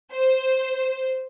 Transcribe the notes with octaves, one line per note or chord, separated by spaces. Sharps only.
C5